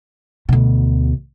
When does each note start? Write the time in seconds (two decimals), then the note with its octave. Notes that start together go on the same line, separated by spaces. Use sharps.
0.49 D2 B2